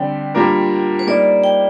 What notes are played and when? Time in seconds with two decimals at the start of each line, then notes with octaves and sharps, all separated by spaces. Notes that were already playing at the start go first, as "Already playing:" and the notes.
Already playing: D3 G3 C4 G4 D5 G5
0.35 G3 A#3 D4 F4 A#4
0.99 C5
1.07 G3 A#3 D#4 D5
1.44 G5